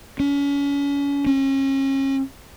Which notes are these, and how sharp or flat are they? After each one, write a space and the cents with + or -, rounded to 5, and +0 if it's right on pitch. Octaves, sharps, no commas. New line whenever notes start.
C#4 +35
C#4 -35